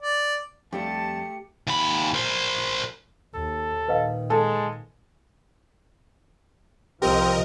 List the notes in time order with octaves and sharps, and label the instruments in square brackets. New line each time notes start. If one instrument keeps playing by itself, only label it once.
[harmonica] D5
[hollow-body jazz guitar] F2 G3 D4 [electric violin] A3 C#7 [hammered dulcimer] G4 [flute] A5
[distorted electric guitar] D#2 B5
A#4 C5
[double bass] D#2 [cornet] A4
[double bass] A#2 D#3 [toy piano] B4 D#5 F5
[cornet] G#3 [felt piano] A4
[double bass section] C2 C3 F3 [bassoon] C4 [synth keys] G4 [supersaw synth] A#4 D#5